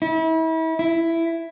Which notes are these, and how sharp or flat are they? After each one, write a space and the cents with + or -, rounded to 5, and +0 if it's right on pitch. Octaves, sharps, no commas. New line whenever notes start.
E4 -35
E4 +10